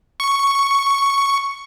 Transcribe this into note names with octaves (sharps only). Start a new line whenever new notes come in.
C#6